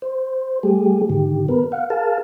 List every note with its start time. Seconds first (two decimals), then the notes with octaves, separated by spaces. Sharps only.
0.02 C5
0.63 G3 A3 G4 G#4
1.10 G#2 D3 D#3 G4
1.49 B3 A#4 B4
1.72 F5 F#5
1.90 G#4 A#4 F5 A5